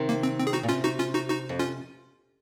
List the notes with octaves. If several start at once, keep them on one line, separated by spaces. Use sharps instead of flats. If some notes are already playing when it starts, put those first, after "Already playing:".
Already playing: C3 D#3
A#3
C4
C4
G#4
D#4 F#4
A#2
C3 C#4 F4
D#4 F#4
C#4 F4
D#4 F#4
D#4 F#4
F2
C#4 F4